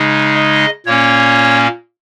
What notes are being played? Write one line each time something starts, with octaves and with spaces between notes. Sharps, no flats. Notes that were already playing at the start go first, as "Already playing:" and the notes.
Already playing: C#3 G#3 D#4
D#5
A#2 A#3 C#4 C#5